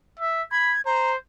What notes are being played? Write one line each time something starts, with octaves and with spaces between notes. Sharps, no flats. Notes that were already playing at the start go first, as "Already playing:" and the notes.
E5
B5 G#6
C5 A#5